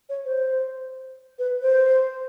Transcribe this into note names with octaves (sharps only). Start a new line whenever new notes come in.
C#5
C5
B4
C5